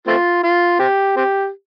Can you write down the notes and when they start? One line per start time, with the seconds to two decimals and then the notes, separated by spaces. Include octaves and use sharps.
0.07 A3 C4 F4
0.43 F4
0.79 C4 G4
1.16 C4 G4